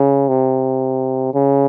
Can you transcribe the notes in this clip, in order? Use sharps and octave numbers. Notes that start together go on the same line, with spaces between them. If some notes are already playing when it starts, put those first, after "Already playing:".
Already playing: C#3
C3
C#3